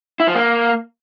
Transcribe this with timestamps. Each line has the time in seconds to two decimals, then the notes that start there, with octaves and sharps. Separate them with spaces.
0.20 E4
0.27 F3
0.35 A#3